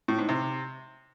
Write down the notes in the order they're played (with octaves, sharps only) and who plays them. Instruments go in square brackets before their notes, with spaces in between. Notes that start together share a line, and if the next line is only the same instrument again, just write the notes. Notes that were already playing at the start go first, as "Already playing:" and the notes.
[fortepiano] A2
G#2
C3